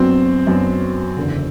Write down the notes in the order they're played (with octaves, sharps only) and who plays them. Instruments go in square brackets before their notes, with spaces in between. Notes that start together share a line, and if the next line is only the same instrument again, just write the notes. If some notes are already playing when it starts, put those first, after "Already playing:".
Already playing: [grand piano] F#2 F#3 B3 D4 F#4 [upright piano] C4 C5
[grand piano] F#2 F#3 B3 D4 F#4
F#1 E2 D3